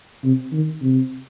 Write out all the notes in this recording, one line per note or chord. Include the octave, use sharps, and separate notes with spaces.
C3
D#3
C3